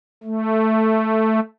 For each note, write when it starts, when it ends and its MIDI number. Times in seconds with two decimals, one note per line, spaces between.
0.24 1.40 57